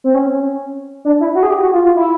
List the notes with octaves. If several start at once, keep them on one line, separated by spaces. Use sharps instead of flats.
C4
C#4
D4
E4
F#4
G#4
G4
F#4
F4
F4
E4